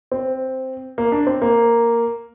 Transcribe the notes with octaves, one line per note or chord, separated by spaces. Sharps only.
C4
A#3
D4
C4
A#3